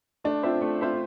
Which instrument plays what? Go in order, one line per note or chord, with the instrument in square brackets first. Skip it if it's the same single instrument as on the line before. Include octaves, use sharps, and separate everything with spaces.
[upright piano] A3 [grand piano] D4
[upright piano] C4 F4 C5 E5
A3
C4 F4 C5 E5